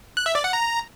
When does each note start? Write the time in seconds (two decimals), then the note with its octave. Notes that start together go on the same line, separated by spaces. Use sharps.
0.17 F#6
0.26 E5
0.35 D5
0.44 F#5
0.53 A#5